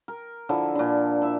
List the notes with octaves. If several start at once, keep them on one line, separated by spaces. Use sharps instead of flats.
A#4
D3 F3 E4
A#2 D3
E4 E5